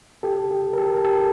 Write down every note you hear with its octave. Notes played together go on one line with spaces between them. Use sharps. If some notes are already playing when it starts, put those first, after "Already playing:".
G4 A4
G4 A4
A#4
G4 A4
A#4
G4 A4